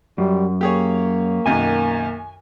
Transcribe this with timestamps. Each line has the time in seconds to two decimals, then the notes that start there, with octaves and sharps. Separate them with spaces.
0.18 F#2 G3
0.61 A#3 G4 G#4 C#5
1.46 B1 F#2 D#3 G#5